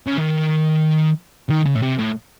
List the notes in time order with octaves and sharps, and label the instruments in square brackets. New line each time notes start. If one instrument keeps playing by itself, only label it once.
[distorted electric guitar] C#3
D#3
D#3
C#3
A2
C3
A2